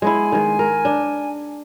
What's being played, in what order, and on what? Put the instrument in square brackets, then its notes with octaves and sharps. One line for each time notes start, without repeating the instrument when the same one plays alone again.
[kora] G#3 B3 E4 [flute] G#5
[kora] D#3 G#3
A#4
D4